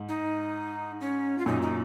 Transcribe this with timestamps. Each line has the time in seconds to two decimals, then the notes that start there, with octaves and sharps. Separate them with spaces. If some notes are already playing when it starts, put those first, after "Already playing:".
Already playing: G#2
0.09 D#4
1.01 C#4
1.38 F4
1.46 F#2 A#2 D#4
1.62 D#4